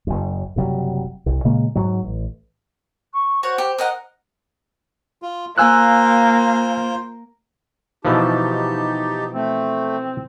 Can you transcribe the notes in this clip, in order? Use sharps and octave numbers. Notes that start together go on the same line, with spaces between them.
F#1 F#2
F#1 C3 F#3 G3
C2
A#2 C#3 G#3 A#3
G#2 F#3
A1
C#6
F#4 C5 C#5 F#5
G4
A#4 D#5 F#5
F4
A#3 F4 C5 G#5 E6 F#6
B2 E3 F3 D#4 G4 A5
A3 C4